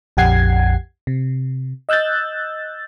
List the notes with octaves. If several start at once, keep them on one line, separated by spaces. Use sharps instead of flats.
A#1 F2 G4 F#5 G#6 C7
C3
D#5 E6 F#6 G6 A6